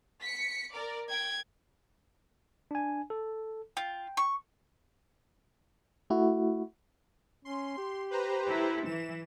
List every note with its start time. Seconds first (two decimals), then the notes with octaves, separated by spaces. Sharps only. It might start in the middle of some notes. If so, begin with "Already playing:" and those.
0.22 B6 C#7
0.72 A#4 D5
1.10 G5 G#6
2.71 D4 G#5
3.10 A4
3.77 F4 G5
4.17 C#6
6.10 A3 E4 F#4
7.45 C#4 C6
7.78 G4
8.11 B4 C5 A#5
8.47 E4 A4
8.86 E3 E7